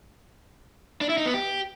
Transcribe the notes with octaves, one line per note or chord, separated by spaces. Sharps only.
D4
E4
D#4
B3
G4